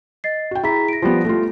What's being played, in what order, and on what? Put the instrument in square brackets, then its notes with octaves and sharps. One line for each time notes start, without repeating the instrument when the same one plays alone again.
[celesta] D#5 A6 C7
[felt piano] F#4 G5
[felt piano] E4 [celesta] G#4 A#5 B6
[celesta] A#6 D7
[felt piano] F3 G3 B3
A3 F4